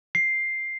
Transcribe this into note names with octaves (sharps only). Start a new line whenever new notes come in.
C7